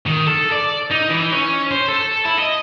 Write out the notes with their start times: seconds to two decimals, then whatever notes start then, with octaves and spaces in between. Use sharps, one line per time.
0.07 D#3
0.27 A4
0.52 D5
0.91 D#4
1.10 E3
1.32 C#4
1.71 C5
1.88 A4
2.25 E4
2.39 D#5